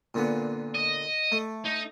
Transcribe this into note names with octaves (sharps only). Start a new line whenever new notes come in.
A#2 D3 B3
D#5
A3
D#4